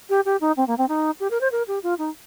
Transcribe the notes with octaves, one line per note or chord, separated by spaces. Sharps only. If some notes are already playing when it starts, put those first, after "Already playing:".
G4
G4
D#4
C4
A#3
C4
D#4
G4
A#4
C5
A#4
G4
F4
D#4